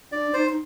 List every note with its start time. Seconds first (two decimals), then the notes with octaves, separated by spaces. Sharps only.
0.12 D4 D5
0.34 D#4 C5
0.49 D#4